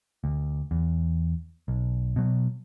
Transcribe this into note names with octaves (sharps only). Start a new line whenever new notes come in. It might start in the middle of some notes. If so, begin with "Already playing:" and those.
D2
E2
B1
B2 F#3